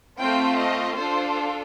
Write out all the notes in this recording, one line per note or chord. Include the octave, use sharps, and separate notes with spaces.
A3 C4 F4 G5
D#5
D4 F4 A4 C5